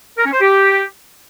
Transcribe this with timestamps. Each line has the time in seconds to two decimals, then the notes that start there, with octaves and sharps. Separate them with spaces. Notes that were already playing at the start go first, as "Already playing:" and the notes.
0.18 A#4
0.26 C#4
0.33 C5
0.41 G4